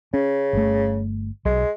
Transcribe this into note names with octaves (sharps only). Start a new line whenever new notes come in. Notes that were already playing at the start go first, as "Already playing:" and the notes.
C#3 C#4
G1 A3
B1 G#3